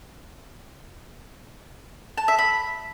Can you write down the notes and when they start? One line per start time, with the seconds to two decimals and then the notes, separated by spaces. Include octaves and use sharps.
2.18 A5
2.28 E5
2.39 B5